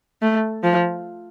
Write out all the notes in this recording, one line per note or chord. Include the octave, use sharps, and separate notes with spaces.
A3
F3